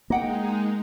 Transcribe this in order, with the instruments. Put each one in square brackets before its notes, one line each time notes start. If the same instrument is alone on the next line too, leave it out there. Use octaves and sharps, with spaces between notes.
[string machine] G#3 D#4 [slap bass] A#3 [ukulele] D#5 F#5 G5